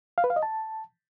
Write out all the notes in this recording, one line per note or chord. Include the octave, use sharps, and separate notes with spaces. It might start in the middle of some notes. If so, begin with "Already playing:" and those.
F5
B4
F5
D#5
A5